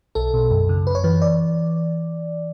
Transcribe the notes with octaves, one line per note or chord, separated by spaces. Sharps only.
B1 A4
B2
F#2
C#3
F#2 B4
C#5
E3 B4
D5